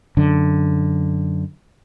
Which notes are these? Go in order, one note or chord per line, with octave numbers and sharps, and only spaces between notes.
F#2 D3